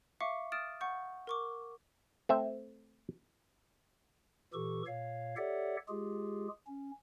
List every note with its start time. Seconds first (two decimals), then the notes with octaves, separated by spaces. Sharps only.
0.21 E5 F5 C#6 D6 C#7
0.52 D#6 F6 A6 D7 E7
0.80 F#5 C#6 G6
1.27 A#4 C#6 D6
2.29 A3 C4 E5
4.53 A#2 E3 G4 A4 C#6
4.86 A#2 C#5 F5
5.37 G4 A4 C#5 D5 E5 F#5
5.88 G#3 F4 G4 G#4
6.67 C#4